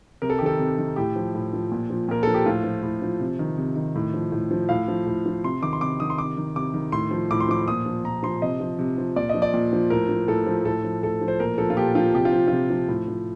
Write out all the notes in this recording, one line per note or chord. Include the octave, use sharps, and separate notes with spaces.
C3 A#4
A4
G4
D#3 A4
C3
D#3
A2 G4
F3
A2
F3
A#2
F3
A#2 A#4
F3 A4
G4
A2 F4
F3
A2
F3
C3
D#3
C3
D#3
A2
F3
A2
F3
A2 F5
F3
A2
F3
C3 C6
D#3 D6
C6
C3 D6
D#3 D#6
C6
C3 D6
D#3
C3 D6
D#3
A2 C6
F3
A2 D6
C6
F3 D6
A#2 D#6
F3
A#2 A#5
F3 C6
C3 D#5
F3
C3
F3
A#2 D5
F3 D#5
D5
A#2
F3
A2 A#4
F3
A2 A4
F3
A2 A4
F3
A2 A4
F3
C5
A#2 A#4
F3 A4
F4
A#2 G4
F3 F4
C3 G4
F4
F3
C3 F4
F3
A2
F3